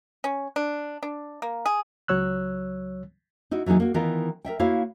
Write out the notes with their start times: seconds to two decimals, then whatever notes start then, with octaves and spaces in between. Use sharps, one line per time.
0.24 C#4
0.56 D4
1.03 D4
1.42 A#3
1.66 G#4
2.08 C#2 F#3 C#5 E6 F#6
3.51 D#4 E4 F#4
3.66 E3 F#3 A#3 D#4 G#4
3.80 A#3 F#4
3.94 D#3 E3 B3 D#4 F4 A#4
4.45 A#4 D5 E5 G5
4.59 A#3 E4 F#4 C#5 E5 F5